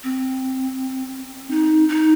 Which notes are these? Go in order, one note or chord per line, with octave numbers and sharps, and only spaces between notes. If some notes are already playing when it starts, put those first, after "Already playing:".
C4
D#4
D#4